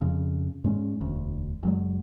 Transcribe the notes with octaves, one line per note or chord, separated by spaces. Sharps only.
F2 C#3
G#2 G#3 C#4
E1 D2
F#1 F#3 G#3